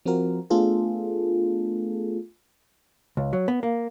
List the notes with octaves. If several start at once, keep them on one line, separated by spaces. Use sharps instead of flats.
F3 C4 F4 F#4 A#4
A3 B3 D4 F4 G#4 A4
C#2
F#3
B3
A#3